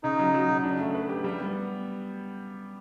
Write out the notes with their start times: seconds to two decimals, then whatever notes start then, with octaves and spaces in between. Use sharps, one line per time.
0.03 C#3 D#4
0.19 F#3
0.34 F#3
0.49 C#3
0.64 D4
0.79 A3
0.95 B4
1.09 G4
1.24 G3
1.40 B3